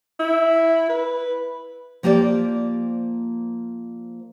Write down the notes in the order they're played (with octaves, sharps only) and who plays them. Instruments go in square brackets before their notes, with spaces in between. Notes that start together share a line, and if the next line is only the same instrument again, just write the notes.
[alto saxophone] E4
B4
[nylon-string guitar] F3 A#3 G4 C5 D5